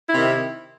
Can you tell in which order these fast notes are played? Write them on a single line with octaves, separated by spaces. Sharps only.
E4 C3 D#3